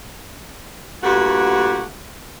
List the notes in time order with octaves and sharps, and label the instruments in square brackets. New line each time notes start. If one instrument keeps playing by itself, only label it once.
[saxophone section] G2 A#2 A3 F#4 G4 F#5